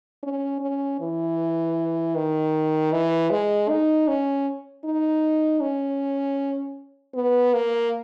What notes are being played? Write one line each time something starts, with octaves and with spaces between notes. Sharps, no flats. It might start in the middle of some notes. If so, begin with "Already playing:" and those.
C#4
C#4
E3
D#3
E3
G#3
D#4
C#4
D#4
C#4
B3
A#3